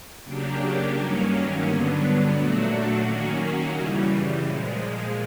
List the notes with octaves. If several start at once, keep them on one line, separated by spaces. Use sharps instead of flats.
C#3 F#3 A#3 D4 G4
G2 D#3 F#3 A#3 C#4
G2 D3 F#3 B3 D4
A#2 F#3 A3 D4 F#4
D#3 F#3 A#3 C#4 F#4
F#2 C#3 E3 G3
A#2 F3 G#3